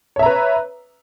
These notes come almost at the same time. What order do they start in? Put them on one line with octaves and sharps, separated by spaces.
C#5 E5 A#5 B4